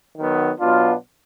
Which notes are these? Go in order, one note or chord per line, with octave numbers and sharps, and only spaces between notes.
D#3 F#3 B3
B2 F#3 B3 D4 F4